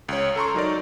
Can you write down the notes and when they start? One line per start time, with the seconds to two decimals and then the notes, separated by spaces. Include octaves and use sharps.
0.09 C#2 C#5
0.36 A4 A#5 C6 C#6
0.54 F#3 D#4 A#4 D5